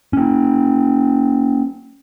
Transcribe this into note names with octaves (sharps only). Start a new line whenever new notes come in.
A#3 C#4